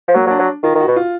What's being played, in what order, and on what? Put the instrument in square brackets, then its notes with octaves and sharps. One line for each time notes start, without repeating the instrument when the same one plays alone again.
[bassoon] F3
[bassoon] F#3 [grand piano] A#3
[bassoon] F#3
[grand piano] D4
[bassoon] F#3
[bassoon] D#3 [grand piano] F4
[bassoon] D#3
[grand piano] F#4
[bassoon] B2
[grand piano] F4